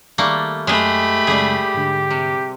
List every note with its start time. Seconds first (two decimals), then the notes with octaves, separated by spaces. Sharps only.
0.18 D#3 G3 A3 A#3 G#4
0.67 F#2 G#3 A3 G4 G#4 B5
1.27 F#2 C#3 G3 G#3 G#4
1.74 G#2 D3
2.11 C3